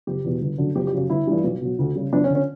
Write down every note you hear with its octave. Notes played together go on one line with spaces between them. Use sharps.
F#1 G4
E2 B2
G1
F#2 D3 F#3
F#1 G4
G4
F#2 C#3 F#3
G1 E4
G2 E3 G3
B1
B2 F#3
D2
C#3 G3
F#1 D4
C#4
D3
C#4